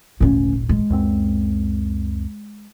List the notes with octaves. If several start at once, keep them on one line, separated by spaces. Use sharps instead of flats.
D#1 G#1 D2 A#2 C#4
G#3
C#2 F#2 C4